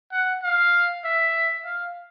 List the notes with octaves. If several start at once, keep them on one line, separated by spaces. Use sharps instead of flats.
F#5
F5
E5
F5